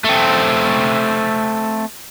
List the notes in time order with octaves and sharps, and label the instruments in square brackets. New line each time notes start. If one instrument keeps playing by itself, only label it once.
[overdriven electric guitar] A3 C4